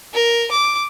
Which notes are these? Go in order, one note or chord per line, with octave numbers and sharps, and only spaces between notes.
A#4
D6